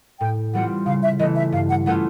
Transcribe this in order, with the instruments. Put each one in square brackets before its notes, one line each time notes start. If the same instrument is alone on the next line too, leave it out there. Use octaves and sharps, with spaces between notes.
[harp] A2 [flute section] G5
[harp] E3 G3 C4 F4 [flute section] F#5
[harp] C#3 [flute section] F5
[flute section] E5
[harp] E3 A3 [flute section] D#5
[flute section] E5
[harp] G2 [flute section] F5
[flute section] F#5
[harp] E3 A3 C#4 F4 [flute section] F#5